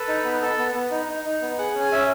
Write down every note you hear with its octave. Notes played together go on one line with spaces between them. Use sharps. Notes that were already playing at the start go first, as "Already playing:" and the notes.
Already playing: A4 B4
D#4
B3
A4
B3
B3
D#4
D#4
D#4
B3
G#4 F#5
C#4
G#5
C#4 E5